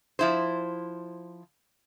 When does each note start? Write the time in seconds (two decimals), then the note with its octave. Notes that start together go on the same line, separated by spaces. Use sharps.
0.19 F3 E4 C5